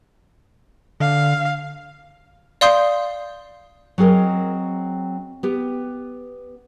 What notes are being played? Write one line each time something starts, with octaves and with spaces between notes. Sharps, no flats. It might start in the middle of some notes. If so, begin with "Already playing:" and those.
D3 F5
D5 F5 C6 D#6 G6 C7
F#3 C4 G#4 A#4 D#5
B3 G4